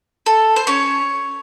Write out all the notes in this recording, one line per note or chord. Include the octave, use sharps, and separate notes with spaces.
A4
C5
C#4 C#5